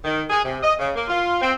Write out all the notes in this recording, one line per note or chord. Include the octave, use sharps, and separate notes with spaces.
D#3
G#4
C3
D#5
C#3
A#3
F4
C4